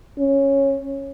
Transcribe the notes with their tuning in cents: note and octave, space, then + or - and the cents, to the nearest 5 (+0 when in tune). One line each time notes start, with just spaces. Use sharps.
C#4 -10